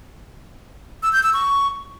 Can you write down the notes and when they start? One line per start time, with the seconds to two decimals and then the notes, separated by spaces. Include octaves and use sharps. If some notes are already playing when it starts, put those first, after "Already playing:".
1.03 E6
1.13 G6
1.23 E6
1.33 C#6